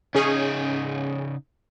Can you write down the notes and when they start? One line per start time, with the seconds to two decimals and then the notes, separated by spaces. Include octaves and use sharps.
0.14 C#3 C#4 D#4 G#4